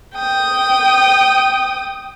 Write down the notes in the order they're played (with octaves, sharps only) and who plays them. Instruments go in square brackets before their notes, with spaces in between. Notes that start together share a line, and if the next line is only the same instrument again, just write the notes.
[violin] G5 D#6